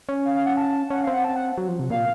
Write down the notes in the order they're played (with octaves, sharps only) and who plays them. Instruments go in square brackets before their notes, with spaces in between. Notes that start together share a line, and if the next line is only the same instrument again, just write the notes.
[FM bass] C#4
[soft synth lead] F5
F5
F#5
A5
[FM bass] C#4 [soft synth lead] F#5
[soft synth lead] F5
[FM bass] C4
[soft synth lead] F#5
A5
F#5
[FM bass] F#3
F3
C3
[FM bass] A#2 [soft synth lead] F5